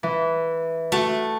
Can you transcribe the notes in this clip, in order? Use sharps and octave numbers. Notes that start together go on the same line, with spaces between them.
E3
A3 F#4